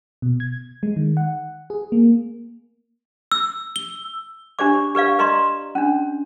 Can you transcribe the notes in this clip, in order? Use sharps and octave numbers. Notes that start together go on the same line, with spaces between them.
B2
G#6
G#3
D#3
F#5
G#4
A#3
E6
G7
D4 G4 C5 D5 D6
G4 B4 D5 F5
B4 D5 D#5 A#5 C6
C#4 D4